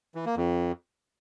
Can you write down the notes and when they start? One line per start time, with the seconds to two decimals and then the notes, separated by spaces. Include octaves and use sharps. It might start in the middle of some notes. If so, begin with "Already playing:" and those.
0.15 E3
0.26 A#3
0.36 F2